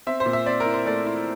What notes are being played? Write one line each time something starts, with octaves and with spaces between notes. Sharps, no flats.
C4 E5
C5
A#2
E5
C4 D5
A#4
E4
C5
A3 D5
E4